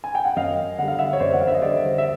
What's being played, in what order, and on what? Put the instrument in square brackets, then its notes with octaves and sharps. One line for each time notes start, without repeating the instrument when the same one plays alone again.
[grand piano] G#5
G5
F#5
F#2 D#5 F5
D3 G3 F#5
F5
E5 F#5
C#5
F#2 C5 D5
F#5
F5
E5
D#5
D3 G3 C5 D5
E5